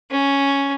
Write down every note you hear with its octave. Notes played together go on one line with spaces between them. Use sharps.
C#4